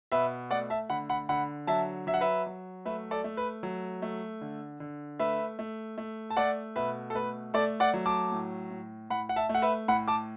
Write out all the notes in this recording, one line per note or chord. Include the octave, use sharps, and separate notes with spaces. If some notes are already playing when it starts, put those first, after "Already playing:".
B2 B4 E5
A3 D5 F#5
E5 A5
D3 F#5 B5
F#5 B5
D3 F#5 B5
F#3 E5 A5
F#3 E5
F#5
B4 E5
F#3
A3 B4 E5
A4 D5
A3
B4
F#3
A3
D3
D3
A3 B4 E5
A3
A3
A5
A3 D5 F#5
B2 B4 E5
A4
A3 B4
A3 A4 D5
D5 F#5
F#3
A5 D6
A2
A2
A2 F#5 B5
F#5
E5 A5
A3
F#5
B4 E5
A2 F#5 B5
A5 D6